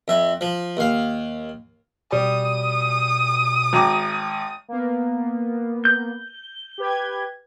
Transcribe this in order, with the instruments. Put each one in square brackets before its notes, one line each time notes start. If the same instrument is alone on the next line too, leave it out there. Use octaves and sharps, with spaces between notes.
[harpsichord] F2 E5
F3
D#2 F5
[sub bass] B2 [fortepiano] G3 [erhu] D#6
[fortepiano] G#1 A#5 D6
[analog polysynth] A#3 B3
[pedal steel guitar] G6
[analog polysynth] G4 B4 G#6